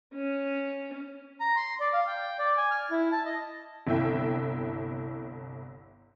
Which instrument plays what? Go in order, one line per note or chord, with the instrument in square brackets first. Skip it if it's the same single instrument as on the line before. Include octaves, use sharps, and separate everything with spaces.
[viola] C#4
[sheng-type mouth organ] A#5
C6
D5
F5
G5
D5
G#5
F6
E4
A5
D#5
[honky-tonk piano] G1 C2 E4 E5 G5